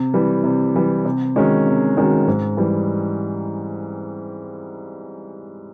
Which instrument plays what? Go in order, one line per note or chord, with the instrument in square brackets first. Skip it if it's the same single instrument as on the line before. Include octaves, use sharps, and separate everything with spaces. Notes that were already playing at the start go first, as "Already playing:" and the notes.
Already playing: [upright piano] C3
E3 G3
C3
E3 G3
C3
D#3 G#3 C#4 F#4
C3
D#3 G#3 C#4 F#4
G#2
E3 G3